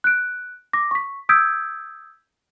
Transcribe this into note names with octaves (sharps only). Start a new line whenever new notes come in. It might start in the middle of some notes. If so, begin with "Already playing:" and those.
F#6 D7
D6 A#6
C#6 B6
D#6 E6 G6 G#6 B6 D7